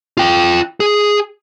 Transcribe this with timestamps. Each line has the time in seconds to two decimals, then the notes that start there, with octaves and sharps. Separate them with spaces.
0.17 F4 G5
0.80 G#4